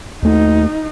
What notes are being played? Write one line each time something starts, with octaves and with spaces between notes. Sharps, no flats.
D#2 A3 D#4